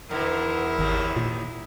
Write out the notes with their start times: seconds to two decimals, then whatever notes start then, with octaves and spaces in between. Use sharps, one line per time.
0.11 E2 B2 D3 D#3 E4 A#4
0.79 G#1 D#2 C3 D#3
1.16 A#2